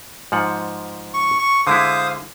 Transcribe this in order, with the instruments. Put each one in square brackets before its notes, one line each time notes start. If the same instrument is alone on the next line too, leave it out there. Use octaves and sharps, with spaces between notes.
[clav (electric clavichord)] G#2 F3 F#5
[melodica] C#6
C#6
[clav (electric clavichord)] D3 G#3 E4 [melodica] C5 F5 D#6